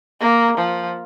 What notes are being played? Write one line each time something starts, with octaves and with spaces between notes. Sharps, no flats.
A#3
F3